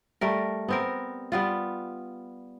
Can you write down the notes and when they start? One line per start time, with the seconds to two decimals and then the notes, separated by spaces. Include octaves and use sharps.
0.21 G3 A3 A#4
0.68 B3 C4 A#4
1.32 G3 B3 F4